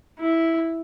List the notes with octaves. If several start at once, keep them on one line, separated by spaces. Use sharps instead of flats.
E4